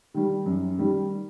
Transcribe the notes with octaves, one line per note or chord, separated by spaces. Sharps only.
D#3 G3
F#2
D#3 G3